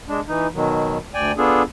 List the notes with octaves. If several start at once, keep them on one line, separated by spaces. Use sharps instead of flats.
G#3 D4
E3 D#4
B2 D#3 F#3
D2 D5 G5 G#5
B3 D4 F4 G#4 A4